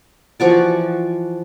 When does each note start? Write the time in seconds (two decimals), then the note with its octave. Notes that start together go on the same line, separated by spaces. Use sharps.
0.40 E3 F3 F#4 D5